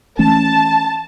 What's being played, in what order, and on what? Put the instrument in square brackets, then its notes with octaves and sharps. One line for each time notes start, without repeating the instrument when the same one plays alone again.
[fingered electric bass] E3 A3 C#4 [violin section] A5